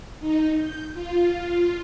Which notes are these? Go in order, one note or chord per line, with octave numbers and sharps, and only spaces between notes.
D#4
G6
F4